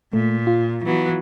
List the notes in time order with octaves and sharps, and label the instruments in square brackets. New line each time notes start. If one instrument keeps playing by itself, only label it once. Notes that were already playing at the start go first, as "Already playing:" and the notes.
[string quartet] A#2 [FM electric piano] A3
[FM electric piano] F4
[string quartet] E3 F#3 B3